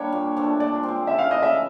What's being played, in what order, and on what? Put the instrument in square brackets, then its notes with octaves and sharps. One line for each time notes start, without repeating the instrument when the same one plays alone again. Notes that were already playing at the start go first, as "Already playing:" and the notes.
Already playing: [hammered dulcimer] G3 A#3 D4 [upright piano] C#5
[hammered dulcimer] A#2
F3 A3 D4
[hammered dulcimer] A#2 [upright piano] D5
[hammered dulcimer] F3 G#3 C4
[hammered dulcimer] C#3 [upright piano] E5
[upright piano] F5
[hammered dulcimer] E3 A3 [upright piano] D#5
[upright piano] E5